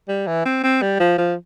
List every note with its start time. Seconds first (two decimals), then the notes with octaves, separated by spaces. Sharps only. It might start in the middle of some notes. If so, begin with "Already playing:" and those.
0.09 G3
0.27 E3
0.45 C4
0.64 C4
0.82 G3
1.00 F3
1.18 F3